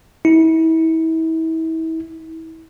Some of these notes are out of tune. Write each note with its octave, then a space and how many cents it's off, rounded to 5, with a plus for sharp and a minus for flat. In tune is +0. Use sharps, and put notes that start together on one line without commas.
E4 -35